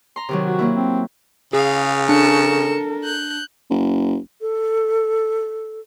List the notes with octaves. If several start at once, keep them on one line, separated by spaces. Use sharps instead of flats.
A#5 C6
C3 D#3 F#3
F#4
F#3 A#3 E4
C4
C#3 G#4 F5
D4 A4 A#4 C#7 E7
F#6 G6
F#1
A4